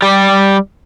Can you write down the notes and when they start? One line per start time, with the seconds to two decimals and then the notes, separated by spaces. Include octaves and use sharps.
0.02 G3 G4